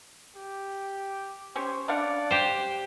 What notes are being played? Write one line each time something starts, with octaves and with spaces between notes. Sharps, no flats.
G4
C#4 G4 C5
D4 D5 F5 F#5
G4 C5